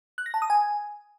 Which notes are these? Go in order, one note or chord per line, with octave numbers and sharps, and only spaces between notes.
F#6
A#6
A5
D#6
G#5